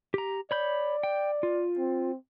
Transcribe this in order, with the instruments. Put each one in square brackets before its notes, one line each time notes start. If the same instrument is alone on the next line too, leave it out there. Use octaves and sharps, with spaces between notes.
[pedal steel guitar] G4 A#5
[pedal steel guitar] C#5 B5 G6 [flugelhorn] D5
[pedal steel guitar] G5
F4
[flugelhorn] C4